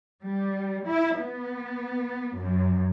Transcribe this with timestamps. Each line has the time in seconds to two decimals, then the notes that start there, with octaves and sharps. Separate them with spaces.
0.23 G3
0.87 E4
1.19 B3
2.36 F#2